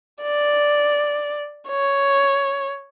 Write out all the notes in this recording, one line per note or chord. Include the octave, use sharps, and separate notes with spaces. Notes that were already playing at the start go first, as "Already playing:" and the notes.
D5
C#5